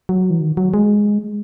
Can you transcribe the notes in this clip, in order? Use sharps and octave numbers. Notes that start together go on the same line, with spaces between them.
F#3
E3
D#3
F#3
G#3